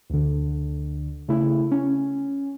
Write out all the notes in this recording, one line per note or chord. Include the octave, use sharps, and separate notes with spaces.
D2 D3
C#3 A3 E4
C#4